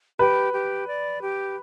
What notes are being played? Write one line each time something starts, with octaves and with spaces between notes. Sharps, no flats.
G4 B4
G4
D5
G4